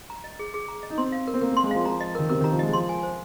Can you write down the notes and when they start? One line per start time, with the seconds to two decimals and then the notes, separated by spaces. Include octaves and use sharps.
0.10 A#5
0.24 D#5
0.39 G#4
0.54 G#4
0.68 A#5
0.83 D#5
0.90 D#4
0.97 C4 C6
1.12 F5
1.28 A#4
1.34 C4
1.41 A#3 A#4
1.52 A#3 C6
1.64 G#3
1.71 F3 F5
1.85 F3 A#5
2.00 D#5
2.15 D#3 A#4
2.30 C3 A#4
2.41 D#3 A#5
2.52 F3
2.59 G#3 D#5
2.73 F3 C6
2.89 G#5
3.03 C5